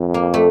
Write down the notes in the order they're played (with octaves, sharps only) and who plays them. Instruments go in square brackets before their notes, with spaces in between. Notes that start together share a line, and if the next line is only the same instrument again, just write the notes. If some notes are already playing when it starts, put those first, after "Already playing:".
Already playing: [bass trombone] F2
[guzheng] A#3
A3